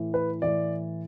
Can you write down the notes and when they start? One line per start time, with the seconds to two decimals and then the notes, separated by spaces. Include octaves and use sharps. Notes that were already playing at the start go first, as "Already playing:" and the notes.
Already playing: A2 E3
0.14 B4
0.42 A2 E3 D5